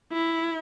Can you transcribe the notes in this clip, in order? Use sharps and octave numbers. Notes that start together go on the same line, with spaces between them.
E4